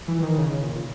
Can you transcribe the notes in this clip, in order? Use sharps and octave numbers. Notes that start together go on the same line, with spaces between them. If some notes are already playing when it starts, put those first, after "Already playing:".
E3
D#3
C#3
A#2